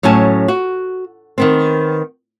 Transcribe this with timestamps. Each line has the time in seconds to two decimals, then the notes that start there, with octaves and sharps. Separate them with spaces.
0.03 A2 F#3 C#4 G#5 A5
0.48 F#4
1.38 D#3 B3 C4